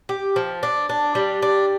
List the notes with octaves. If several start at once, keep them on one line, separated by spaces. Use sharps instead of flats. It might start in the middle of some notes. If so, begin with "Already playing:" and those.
G4
F3
D4
D4
G3
D4